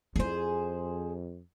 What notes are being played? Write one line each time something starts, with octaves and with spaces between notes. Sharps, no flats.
F2 D#4 E4 G#4 C5